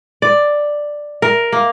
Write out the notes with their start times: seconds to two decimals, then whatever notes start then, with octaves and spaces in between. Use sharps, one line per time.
0.22 D5
1.22 A#4
1.52 A#3